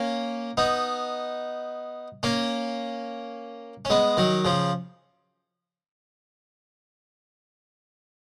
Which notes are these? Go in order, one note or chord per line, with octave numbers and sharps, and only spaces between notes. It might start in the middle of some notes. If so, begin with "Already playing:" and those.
Already playing: A#3 C#4
B3 D#4
A#3 C#4
C#4
G#3 B3
D#3 F#3
C#3 F3